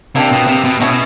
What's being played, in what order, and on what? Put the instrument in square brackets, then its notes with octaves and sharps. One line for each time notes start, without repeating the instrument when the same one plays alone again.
[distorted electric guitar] C3 [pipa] A#3 D4 G4
[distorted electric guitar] B2
C3
B2
[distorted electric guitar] B2 [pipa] A3 C#4 E4 G#4